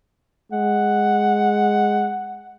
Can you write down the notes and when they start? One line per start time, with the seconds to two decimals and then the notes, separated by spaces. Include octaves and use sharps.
0.52 G#3 F#5